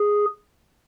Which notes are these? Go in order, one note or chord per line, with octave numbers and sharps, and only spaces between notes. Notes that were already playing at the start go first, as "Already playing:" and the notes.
Already playing: G#4